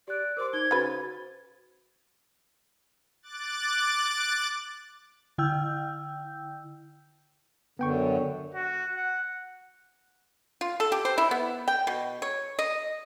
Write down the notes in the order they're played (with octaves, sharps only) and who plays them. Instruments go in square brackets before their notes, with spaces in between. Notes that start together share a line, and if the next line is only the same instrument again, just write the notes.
[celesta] G4 F#6 [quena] D5
[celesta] A#4 C6 [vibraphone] C5 [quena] D6
[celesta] D#4 G7 [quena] G#6
[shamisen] C#3 B4 [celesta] F#4 A6
[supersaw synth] D6 F#6 A6
[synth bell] D3 E4 G5 E6 G6
[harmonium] F#2 D3 [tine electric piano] B3 G5 C#6
[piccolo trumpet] F#4
F#5
[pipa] F4
A4
G4
C5
E4
B3
G5
B2
C#5
D#5